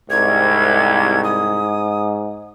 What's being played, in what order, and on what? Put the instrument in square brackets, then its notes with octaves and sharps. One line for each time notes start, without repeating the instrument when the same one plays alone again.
[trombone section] C2 [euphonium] G#2 [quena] G#6
[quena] D#6